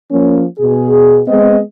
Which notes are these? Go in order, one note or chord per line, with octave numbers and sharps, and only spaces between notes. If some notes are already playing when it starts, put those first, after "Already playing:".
F3 A#3 C#4
B2 G#4
G#3 B3 C4 D#5